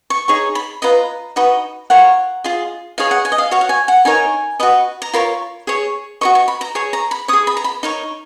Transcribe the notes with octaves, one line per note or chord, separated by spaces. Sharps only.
C#6
D#4 G#4 C#5 C#6
B5
F4 B4 D#5 A#5
D#4 F#4 B4 D#5
F4 A#4 C#5 F#5
F4 G#4 D#5
D#4 G#4 C#5 F5
F#5
G#5
D#5
F5
F#4 C#5 F5
F#5
G#5
F#5
D#4 A#4 C#5 G#5
F#4 B4 D#5
A#5
F4 A#4 C#5 B5
G#4 C#5
F#4 A#4 D#5 C#6
C#6
B5
A#5
G#4 C#5
A#5
B5
G#4 C#5 D#6
B5
A#5
B5
D#4 A#4 C#5